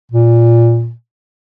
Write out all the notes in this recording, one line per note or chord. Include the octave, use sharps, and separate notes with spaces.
A#2